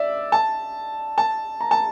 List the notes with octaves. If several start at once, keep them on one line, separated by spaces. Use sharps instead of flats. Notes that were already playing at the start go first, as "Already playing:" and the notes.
Already playing: D5 E5
A5
A5
A#5
A5